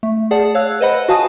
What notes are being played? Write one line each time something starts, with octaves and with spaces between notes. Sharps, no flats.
A3
G#4 D5 F#5 A5
C#5 F5 E6 F#6
B4 C5 D#5 F#5 B5
F#4 B4 F5 G#5 A5 D#6